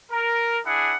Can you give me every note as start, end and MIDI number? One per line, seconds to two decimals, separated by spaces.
0.12 0.59 70
0.66 0.96 62
0.66 0.96 64
0.66 0.96 68
0.66 0.96 78